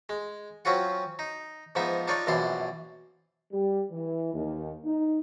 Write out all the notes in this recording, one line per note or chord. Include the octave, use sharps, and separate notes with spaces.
G#3
F#3 C4 C#4 F4 F#5
D#4
G#2 F3 B3 D#4 E5
D4 D#4 F4 C#5 D5
A#1 F#2 B2 E3 D4 C6
G3
E3
D#2
D#4